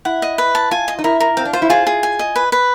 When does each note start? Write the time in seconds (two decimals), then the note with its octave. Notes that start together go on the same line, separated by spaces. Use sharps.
0.05 E4 F#5
0.22 D#5
0.38 B4
0.55 A5
0.71 F4 G#5
0.88 D#5
0.99 D#4
1.04 E4 A#4
1.20 A#4
1.37 C4 F5
1.45 D4
1.53 F4 C5
1.62 E4
1.70 F4 G#4
1.87 G#4
2.03 G#5
2.19 D#5
2.36 B4
2.52 B4